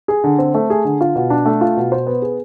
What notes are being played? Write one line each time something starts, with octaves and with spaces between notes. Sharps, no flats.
G#4
D3
C4
A3
G#4
D3
F4
B2
D4
A3
F4
B2
C5
B3
G#4